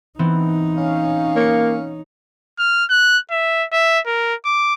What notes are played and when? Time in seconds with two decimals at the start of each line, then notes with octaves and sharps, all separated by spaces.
0.19 E3 B3 C4 D#4
0.77 C#4 F5
1.36 A#3 C#5 C#7
2.59 F6
2.90 F#6
3.31 E5
3.72 E5
4.07 A#4
4.45 D6